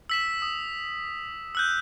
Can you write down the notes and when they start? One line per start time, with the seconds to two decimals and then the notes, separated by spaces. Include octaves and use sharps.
0.09 E6 B6 E7
0.42 D#6
1.55 E6 F#6 G6